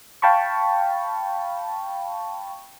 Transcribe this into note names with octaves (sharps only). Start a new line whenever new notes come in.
F5 G5 A5 B5 C#6